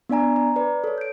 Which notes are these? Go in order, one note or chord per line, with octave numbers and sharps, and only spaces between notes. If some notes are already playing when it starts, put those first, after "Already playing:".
B3 D4 D5 G#5 A#5
A#5
B4 D5
A4 C#5
G6 D7